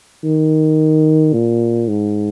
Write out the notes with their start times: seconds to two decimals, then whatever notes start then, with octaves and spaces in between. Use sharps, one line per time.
0.24 D#3
1.33 A#2
1.88 G#2